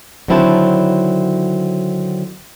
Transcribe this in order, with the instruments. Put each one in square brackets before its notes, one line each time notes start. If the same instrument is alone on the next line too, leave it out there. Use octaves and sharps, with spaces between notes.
[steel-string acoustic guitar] D3 D#3 F#3 C4 E4 A5